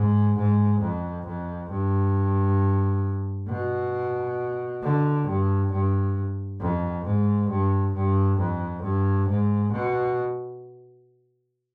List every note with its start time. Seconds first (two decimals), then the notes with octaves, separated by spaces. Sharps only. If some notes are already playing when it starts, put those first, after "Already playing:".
Already playing: G#2
0.37 G#2
0.81 F2
1.26 F2
1.70 G2
3.48 B2
4.82 D3
5.27 G2
5.72 G2
6.60 F2
7.06 G#2
7.49 G2
7.94 G2
8.38 F2
8.83 G2
9.29 G#2
9.72 B2